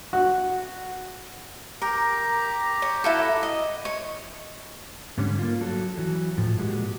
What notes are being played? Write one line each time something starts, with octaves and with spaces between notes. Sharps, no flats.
F#4
G4 A#4 A#5
C#5
E4 F#4 A4
D#5
C#5
G#2 D3 G3 C#4
A#3 F4
F#3 A4
E3 F#3
A2 F3
A#2 G#3 F#4 G4